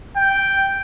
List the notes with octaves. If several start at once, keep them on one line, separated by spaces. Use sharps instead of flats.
G5